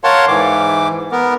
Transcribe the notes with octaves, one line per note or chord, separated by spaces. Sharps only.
A#4 C#5 F5 F#5 A5 C6
G#2 E3 D6
B3 A#4